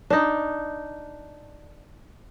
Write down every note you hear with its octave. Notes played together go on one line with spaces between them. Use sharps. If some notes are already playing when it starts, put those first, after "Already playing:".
D4 D#4